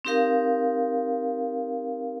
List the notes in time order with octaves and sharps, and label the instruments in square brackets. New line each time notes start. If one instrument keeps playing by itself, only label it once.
[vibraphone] C4 D#4 G4 A#4 F5